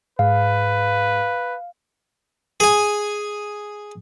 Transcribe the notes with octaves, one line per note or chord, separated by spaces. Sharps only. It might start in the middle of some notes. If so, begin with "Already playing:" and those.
G#2 B4 F5
G#4 G#5